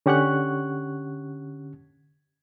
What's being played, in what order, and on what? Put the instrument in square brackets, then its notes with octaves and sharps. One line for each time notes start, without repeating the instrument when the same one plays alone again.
[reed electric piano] D3 C#4 G4 F#5 C#6 F#6